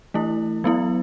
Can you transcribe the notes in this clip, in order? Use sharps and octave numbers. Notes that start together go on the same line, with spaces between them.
E3 A3 E4
F#3 B3 E4